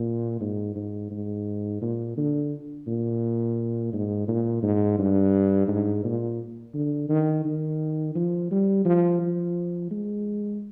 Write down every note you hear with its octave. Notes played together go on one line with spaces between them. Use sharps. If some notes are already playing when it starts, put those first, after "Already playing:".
Already playing: A#2
G#2
G#2
G#2
A#2
D3
A#2
G#2
A#2
G#2
G2
G#2
A#2
D3
D#3
D#3
F3
G3
F3
F3
G#3